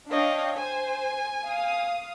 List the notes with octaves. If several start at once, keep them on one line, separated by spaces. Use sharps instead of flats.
D4 C#5 D#5 F5 G5
C5 G#5
F5 D#6